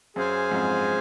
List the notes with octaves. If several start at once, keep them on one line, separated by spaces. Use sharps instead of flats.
F#2 G#4 C5 F5 G#5
F2 G#2